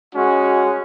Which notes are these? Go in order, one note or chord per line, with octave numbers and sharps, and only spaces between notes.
G#3 C#4 F#4